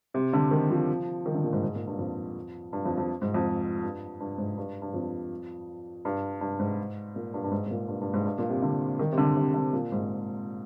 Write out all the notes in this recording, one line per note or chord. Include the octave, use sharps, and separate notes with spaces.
C3
D3
D#3
F3
D#3
D3
A#2
G#2
G#2
A#2
G2
F2
G2
F2
F2
G#2
F2
G2
G2
G#2
G2
G2
F2
G2
G2
G#2
A#2
G2
G2
G#2
G#2
A#2
G2
G2
G#2
G2
A#2
C3
D3
D#3
C3
D3
C3
D3
A#2
G#2